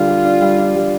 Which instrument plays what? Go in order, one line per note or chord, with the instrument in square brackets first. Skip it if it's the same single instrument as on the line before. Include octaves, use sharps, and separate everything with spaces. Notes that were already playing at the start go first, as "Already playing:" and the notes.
Already playing: [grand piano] D3 G3 D4 [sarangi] F4
[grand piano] G4
D4
G3
D4
G3